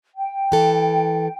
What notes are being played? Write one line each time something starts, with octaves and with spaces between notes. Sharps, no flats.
G5
E3 A4